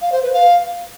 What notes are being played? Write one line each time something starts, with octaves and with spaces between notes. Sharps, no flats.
F5
C5
B4
F5